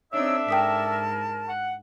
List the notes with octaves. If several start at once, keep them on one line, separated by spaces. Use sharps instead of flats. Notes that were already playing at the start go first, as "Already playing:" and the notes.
C4 D4 D#4 A4 C#5 D5 E5 E6
G#2 A#4 G5 A5 D#6 B6
F#5